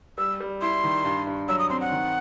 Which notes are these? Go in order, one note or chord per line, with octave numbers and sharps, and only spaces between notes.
G3 E6
G3
E4 C6
D#3
G2
G2
F#3 E6
D#6
C4 C6
F#5
D#3